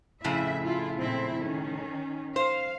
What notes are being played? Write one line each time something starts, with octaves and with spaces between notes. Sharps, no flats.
F2 A2 C#3 E4 E5
E4 F4
A#2 C4 E4
D#3 C#4
C5 F5